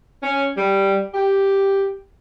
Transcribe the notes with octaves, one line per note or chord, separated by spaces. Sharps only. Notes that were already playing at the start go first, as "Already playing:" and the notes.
C#4
G3
G4